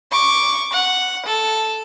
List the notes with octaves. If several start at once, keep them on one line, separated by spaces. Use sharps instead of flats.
C#6 D6
F#5
A4